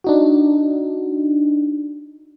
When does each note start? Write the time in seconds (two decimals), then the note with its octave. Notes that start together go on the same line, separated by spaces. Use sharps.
0.04 D4 D#4 F#4